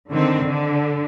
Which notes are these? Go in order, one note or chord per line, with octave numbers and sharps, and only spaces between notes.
D3 D#3 C4
D3